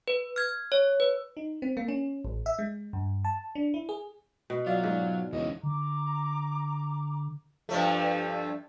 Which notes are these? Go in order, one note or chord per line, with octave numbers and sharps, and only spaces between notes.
B4
F6 G#6
C#5
B4
D#4
C4
A#3
C#4
A1
E5
G#3
G2
A5
D4
E4
G#4
B2
F#3 F4 D5 E5 F5
G#2
E2 G#2 C#3 C#4 D#5
D3 A#5 D6
G2 F3 A3